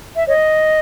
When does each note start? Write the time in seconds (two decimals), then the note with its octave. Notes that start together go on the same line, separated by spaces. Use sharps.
0.15 E5
0.27 C#5 D#5